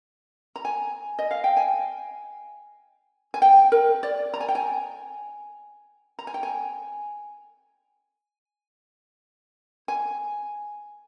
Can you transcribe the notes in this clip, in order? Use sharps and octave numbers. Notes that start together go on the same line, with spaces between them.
A#5
G#5
D#5
F5
G5
G#5
G#5
G5
A#4
D5
A#5
G#5
G5
G#5
A#5
G#5
G5
G#5
G#5